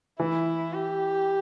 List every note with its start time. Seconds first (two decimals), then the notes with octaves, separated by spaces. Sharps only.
0.19 E3 E4
0.73 G4